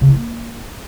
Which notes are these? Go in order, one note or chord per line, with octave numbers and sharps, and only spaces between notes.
C#3
E4
A#3